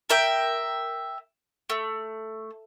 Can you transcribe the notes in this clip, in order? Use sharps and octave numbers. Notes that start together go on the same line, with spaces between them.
A#4 E5 G5
A3